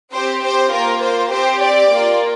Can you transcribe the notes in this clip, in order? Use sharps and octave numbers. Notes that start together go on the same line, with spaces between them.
C4 G4 C5
C5
A#3 F4 A#4
C5
C4 G4 C5
D5
A#3
F4